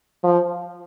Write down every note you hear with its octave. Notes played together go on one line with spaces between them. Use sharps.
F3